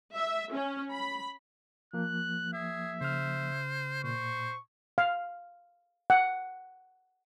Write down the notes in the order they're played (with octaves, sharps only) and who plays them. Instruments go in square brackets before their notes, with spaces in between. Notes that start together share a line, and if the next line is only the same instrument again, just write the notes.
[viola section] E5
C#4
B5
[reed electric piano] F3 A#3 [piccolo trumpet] F#6
[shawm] G#4 [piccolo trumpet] E5
[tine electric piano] C#3 F6 [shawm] C5
[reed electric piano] A#2 [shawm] C5 [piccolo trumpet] C#6
[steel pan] F5
F#5